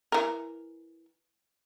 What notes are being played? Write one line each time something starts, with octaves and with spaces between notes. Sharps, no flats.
E3 A#4